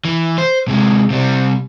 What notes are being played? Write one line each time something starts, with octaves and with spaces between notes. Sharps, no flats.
E3
C5
C3 G#3
C3 G3